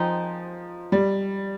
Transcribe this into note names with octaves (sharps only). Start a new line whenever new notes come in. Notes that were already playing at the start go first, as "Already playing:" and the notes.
Already playing: D#3 F3 G#3 C4 D#4
G3